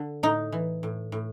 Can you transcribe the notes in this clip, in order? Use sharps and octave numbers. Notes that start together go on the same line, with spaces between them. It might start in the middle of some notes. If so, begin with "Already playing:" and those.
Already playing: D3
A2 D#4
E3
A2
A2